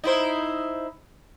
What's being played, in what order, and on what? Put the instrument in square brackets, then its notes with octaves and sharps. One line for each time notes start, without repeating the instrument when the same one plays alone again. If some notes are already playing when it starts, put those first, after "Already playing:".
[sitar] D#4 E4 C5